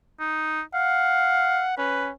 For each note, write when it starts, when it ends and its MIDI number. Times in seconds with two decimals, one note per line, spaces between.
0.20 0.61 63
0.74 1.65 77
0.74 1.73 78
1.78 2.12 61
1.78 2.07 71